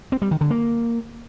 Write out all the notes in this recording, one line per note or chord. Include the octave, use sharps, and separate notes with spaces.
C4
G3
D#3
D3
A#3